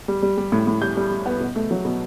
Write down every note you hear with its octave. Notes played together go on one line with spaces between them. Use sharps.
G3
G3
G3
A2
A2
G3 G6
G3
G3
B3
B2
A3
F#3
B2